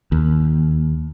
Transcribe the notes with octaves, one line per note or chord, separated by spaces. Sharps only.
D#2